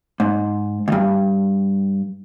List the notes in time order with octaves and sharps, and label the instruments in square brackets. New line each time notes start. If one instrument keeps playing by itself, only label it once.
[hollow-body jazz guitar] G#2
D2 G2